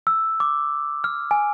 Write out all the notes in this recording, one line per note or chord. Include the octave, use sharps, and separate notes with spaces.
E6
D6
F6
G#5